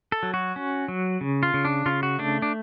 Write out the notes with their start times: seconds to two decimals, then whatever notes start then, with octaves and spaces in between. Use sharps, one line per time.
0.12 A4
0.23 F#3
0.34 F#4
0.56 C#4
0.88 F#3
1.21 C#3
1.43 F4
1.54 C#3
1.65 D4
1.86 C#3 F4
2.03 F#4
2.19 A3 D4
2.42 D4